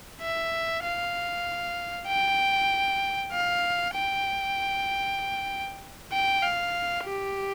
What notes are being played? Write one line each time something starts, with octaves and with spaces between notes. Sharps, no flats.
E5
F5
G5
F5
G5
G5
F5
G4